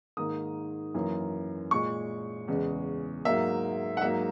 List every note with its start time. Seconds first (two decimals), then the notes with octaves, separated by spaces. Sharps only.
0.17 G#2 D#3 A#3 D#6
0.94 F#2 E3 A#3
1.71 A#2 G#3 C#6
2.48 E2 C#3 G#3
3.25 G#2 F#3 A#3 E5
3.97 F#5
4.01 G#2 F#3 A#3 E5